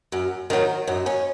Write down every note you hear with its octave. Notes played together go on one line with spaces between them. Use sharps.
F#2
D#3 F#3
F#2 D#4
C#4